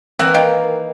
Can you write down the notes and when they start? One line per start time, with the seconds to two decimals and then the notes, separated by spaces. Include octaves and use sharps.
0.19 E3 A#3 C4 D#4 E5 F#5
0.34 D#3 F5 G5